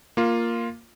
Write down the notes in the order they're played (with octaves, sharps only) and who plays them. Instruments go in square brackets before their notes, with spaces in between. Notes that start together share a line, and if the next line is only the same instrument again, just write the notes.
[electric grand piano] A#3 F4